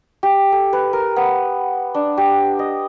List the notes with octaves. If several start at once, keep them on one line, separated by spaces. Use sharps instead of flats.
G4
A4
B4
A#4
B3
D4
G4
D#5